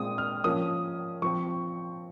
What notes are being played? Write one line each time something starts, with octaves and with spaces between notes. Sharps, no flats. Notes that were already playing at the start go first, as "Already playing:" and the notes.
Already playing: A#2 G#3 C4 D#6
F6
F3 A#3 C#4 D#6
F3 C4 C#6